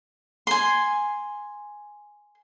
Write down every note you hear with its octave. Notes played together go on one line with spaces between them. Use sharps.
G#5 C6